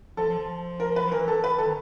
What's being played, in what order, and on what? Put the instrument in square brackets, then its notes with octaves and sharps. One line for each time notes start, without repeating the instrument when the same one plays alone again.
[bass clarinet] F3 [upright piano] A4
[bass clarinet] F3
F3
[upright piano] A#4
B4
[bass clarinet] F3
[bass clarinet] E3 [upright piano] A#4
[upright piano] A4
B4
A4
[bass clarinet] D#3